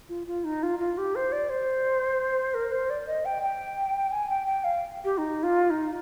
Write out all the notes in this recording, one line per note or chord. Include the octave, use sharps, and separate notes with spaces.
F4
F4
D#4
F4
F4
G4
C5
D5
C5
A#4
C5
D5
D#5
G5
G5
G#5
G5
G5
F5
G4
D#4
F4
D#4